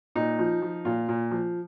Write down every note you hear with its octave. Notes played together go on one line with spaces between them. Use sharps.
A#2 D#4
F3
F3
A#2 F4
A#2
F3